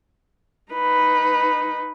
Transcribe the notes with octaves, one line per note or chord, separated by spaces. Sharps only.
D#4 B4